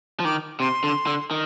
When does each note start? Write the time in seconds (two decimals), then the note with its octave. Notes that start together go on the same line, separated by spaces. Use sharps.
0.20 F3
0.25 D#3 D6
0.60 C3 C6
0.84 D3
1.07 D3
1.31 D#3